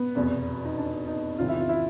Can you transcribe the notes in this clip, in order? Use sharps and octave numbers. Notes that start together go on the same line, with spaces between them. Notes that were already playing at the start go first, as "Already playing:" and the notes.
Already playing: B3
F1 E2 B2
D#4
D4
D#4
E2 C3 D#3 F4
E4
F4
E4